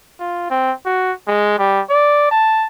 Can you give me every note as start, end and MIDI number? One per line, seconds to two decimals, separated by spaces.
0.19 0.48 65
0.50 0.72 60
0.86 1.13 66
1.28 1.54 56
1.59 1.81 55
1.90 2.31 74
2.31 2.67 81